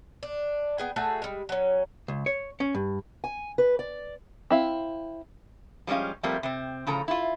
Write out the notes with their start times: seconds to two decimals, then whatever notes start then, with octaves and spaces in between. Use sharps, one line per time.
0.23 D4
0.78 B3 G#4 G5
0.96 A3 F#4 G#4 E5
1.22 G3 G#3
1.49 F#3 C#4
2.08 C#2
2.26 C#5
2.60 C#4
2.75 G2
3.24 G#5
3.58 B4
3.79 D5
4.50 C4 E4 F5
5.87 F3 G3 G#3 C#4 F5
6.23 F3 G3 A3 A#3 C4
6.43 C3 C4
6.87 A2 C#3 F3 A4 A#5
7.08 E4 F4